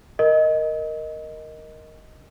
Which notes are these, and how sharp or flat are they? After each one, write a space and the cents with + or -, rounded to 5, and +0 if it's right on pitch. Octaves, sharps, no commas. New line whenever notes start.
A#4 +0 D#5 +0